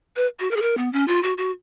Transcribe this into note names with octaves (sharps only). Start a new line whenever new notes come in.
B4
F#4
A#4
G#4
A#4
B3
C#4
F4
F#4
F#4